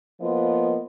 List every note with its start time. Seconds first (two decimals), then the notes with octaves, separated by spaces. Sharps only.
0.21 F3 A#3 B3 F4 D#5